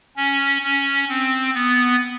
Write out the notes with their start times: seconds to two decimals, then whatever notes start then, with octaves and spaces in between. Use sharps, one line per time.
0.16 C#4
0.63 C#4
1.09 C4
1.55 B3